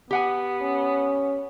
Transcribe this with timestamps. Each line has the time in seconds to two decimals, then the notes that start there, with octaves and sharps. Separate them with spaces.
0.11 B3 G4 F#5 G#5
0.61 C#4